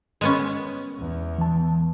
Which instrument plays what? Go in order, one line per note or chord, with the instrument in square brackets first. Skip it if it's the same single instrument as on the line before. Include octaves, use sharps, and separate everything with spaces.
[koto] G#3 B3 C#4
[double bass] E2
[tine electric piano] E3 A5